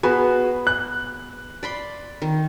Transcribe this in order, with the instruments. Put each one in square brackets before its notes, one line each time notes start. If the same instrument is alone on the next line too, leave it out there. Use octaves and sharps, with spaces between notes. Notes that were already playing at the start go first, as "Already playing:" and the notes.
[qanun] B3 [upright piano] F#4 G#4 B4
[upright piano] F#6
[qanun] D5 B5 C6
D#3